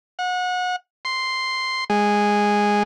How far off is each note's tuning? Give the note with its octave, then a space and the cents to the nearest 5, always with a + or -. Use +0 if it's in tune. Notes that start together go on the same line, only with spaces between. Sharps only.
F#5 -30
C6 +0
G#3 -10